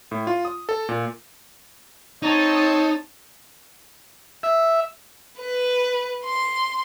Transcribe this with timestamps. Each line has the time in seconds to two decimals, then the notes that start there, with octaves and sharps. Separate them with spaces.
0.11 A2
0.27 F4
0.45 D#6
0.69 A4
0.89 A#2
2.23 C4 D#4 C#5 A5
4.43 E5
5.40 B4
6.24 C6